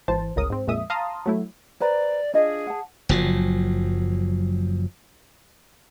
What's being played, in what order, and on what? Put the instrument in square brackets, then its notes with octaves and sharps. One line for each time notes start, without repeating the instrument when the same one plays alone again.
[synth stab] G#1 E3 C5 A5
G1 C#2 C#3 A#4 D#6
G#2 C4
A#1 F2 A#2 G#3 E5 D#6
F5 A5 A#5 C6 D#6
F#3 A3 E4
[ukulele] B4 C5 A#5 [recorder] D5
[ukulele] D4 F4 D#5 [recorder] G#4
[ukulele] F#5 A5
[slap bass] F#1 F3 F#3